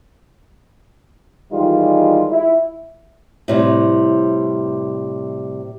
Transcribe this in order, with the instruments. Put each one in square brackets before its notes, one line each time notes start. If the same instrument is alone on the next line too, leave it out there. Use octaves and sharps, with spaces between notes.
[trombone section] D#3 E3 G3 G#3 D#4 F4
E4
[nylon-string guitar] A2 C3 G3